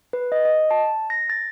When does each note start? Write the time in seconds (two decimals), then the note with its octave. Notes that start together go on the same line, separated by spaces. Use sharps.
0.13 B4
0.32 D#5
0.45 D#5
0.71 A5
1.10 A#6
1.30 A6